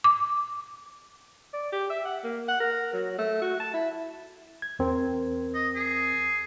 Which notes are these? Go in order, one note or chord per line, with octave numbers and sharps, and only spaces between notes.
D6
D5
G4
E5
F#5
A#3
F#5
A#4
F#3
A3
F#4
A5
E4
G#6
E2 C4 A#4
D#5
G#4